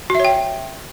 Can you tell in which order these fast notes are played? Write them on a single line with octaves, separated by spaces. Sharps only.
F#4 E5 C#5 G5